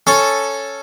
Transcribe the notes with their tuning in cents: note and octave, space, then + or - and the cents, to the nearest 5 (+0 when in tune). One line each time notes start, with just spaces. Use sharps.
C#4 +0 A4 +0